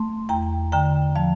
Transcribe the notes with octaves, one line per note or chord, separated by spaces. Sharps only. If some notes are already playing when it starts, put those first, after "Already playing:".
Already playing: A3 C6
E2 G5 A#5
D3 G5 A#5
F3 F5 A5